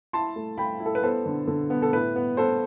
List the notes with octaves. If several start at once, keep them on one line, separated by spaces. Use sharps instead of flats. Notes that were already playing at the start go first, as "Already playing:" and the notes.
E4 A5 C6
A3
A3 G5 B5
E4
A4
B4
B3 A4 C5
D3
D3
B3
A4
A2 B4
B3
B3 A4 C5